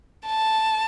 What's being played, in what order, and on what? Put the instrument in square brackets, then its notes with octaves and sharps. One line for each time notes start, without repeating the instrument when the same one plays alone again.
[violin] A5